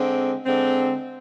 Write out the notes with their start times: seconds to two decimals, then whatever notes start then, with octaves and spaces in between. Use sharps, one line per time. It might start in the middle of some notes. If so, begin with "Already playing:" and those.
Already playing: D3 G#3 C4
0.45 D3 G#3 C4